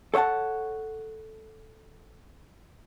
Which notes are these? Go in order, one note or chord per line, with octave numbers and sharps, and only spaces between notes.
A4 C#5 E5 F#5 A5